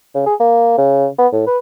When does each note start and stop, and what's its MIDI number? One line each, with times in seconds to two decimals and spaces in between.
0.14 0.23 49
0.26 0.34 68
0.40 0.76 58
0.77 1.07 49
1.18 1.27 59
1.32 1.46 45
1.47 1.58 71